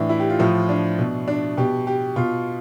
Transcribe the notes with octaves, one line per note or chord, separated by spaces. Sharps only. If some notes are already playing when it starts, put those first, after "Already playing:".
Already playing: A2 E3 D4
E4
G4
F4
A2 F3
D4
B2
D4
B2 G4
G4
B2 F4